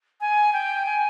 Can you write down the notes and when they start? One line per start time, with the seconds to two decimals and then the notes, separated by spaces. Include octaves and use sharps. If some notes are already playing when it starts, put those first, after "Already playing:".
0.21 G#5
0.53 G5
0.86 G#5